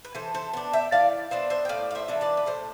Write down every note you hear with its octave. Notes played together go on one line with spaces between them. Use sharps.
B4
E3 A4 C5
A4 C5
B3 D4
E5 G5
E3 D5 F5
B3 D4 C5 E5
C5 E5
G5
A2 D5 F5
F5
C5 E5
E3 A3 D4
B4 D5
B4
A2 A4 C5